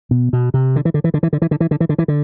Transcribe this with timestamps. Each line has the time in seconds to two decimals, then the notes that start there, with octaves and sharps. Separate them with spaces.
0.11 B2
0.33 B2
0.54 C3
0.76 D3
0.85 E3
0.94 D3
1.04 E3
1.14 D3
1.23 E3
1.33 D3
1.42 E3
1.51 D3
1.60 E3
1.71 D3
1.80 E3
1.89 D3
1.98 E3
2.08 D3